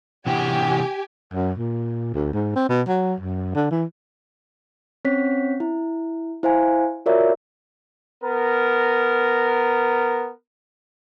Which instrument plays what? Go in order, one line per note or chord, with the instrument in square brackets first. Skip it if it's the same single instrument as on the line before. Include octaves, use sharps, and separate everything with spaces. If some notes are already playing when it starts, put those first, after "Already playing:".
[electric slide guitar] C3 E3 F#4 [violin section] G4 G#5
[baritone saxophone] F#2
A#2
D2
G#2
C4
B2
F#3
F#2
D3
E3
[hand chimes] C4 C#4 C#5 B6
E4
E4 C5 F5 G#5
F4 F#4 A#4 C#5 D5 E5
[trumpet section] B3 A#4